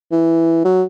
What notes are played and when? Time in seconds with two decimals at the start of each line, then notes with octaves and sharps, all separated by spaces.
0.11 E3
0.64 F#3